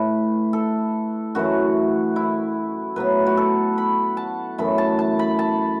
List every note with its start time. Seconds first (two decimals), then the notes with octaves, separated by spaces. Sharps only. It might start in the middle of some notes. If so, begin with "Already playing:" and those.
Already playing: A2 A3 B4
0.53 A4
1.35 F#2 E3 A3 F#4
2.16 E4
2.96 A2 F#3 B3 B4
3.27 F#4
3.37 A4
3.78 B5
4.17 A5
4.58 F#2 E3 A3 B5
4.78 A5
4.99 A5
5.19 B5
5.39 A5